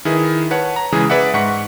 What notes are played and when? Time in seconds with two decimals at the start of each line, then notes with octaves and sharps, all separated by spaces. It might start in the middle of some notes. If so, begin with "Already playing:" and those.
0.05 D#3 E4 G#4 B4
0.51 B4 C#5 F#5 A5
0.76 A#5
0.92 C#3 E3 G#3 G#4
1.10 G#4 B4 D5 E5 F#5
1.34 G#2 F#5 C#6 B6